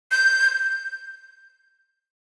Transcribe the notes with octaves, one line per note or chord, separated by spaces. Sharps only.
G6